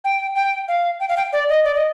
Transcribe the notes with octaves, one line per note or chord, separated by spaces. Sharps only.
G5
G5
F5
G5
F5
G5
D5
D#5
D5
D#5